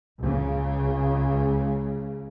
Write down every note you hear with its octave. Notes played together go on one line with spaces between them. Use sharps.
C#2 C#3